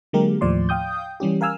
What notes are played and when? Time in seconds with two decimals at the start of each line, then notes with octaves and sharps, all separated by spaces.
0.13 D3 F#3 G#3 A#3 G4 A#4
0.41 D#2 A2 F3 D5 C6
0.69 F5 G5 D#6 G6
1.20 E3 G3 C#4 G4
1.41 A#4 F5 G#5 E6 F6